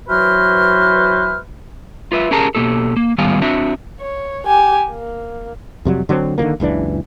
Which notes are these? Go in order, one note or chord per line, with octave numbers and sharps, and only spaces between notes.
E3 F#3 F#4 B4 C5 F6
F4 B4 E5
C#4 G4 G#4 A#4 A5 A#5
B2 F3 A#3 G4 A4
A#3
A2 D#3 G3 B3 F5 G#5
C4 D4 F#4 E5
C#5
G4 G#5
A#3
F2 C3 F#3 G3
D3 F#3 G#3 C4
D3 D#3 F3 A#3
F#1 C#2 E3 D4